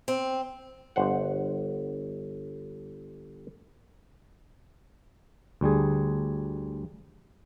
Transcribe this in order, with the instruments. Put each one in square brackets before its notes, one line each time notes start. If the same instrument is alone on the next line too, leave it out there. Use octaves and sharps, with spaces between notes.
[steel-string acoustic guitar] C4
[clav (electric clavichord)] G1 C5 F#5
D2 G3 G#4